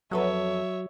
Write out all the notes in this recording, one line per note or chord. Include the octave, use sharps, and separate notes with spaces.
F2 F#3 A4 B4 C#5 E5